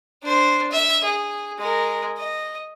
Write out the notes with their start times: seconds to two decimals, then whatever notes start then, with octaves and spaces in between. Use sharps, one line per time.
0.23 D4 C5
0.72 E5
1.04 G#4
1.58 G#3 A#4
2.18 D#5